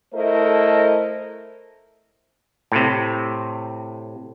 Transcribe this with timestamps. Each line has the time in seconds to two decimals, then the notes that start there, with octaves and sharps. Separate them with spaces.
0.14 A3 E4 A4 A#4 C5 D#5
2.72 A2 C3